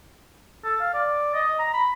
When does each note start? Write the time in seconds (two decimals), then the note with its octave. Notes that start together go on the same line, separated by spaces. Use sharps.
0.64 A4
0.81 F5
0.94 D5
1.34 D#5
1.59 A#5
1.74 B5